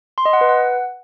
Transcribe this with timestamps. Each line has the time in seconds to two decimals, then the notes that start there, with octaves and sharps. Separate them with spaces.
0.18 C6
0.25 D#5
0.33 F#5
0.41 B4
0.49 F#5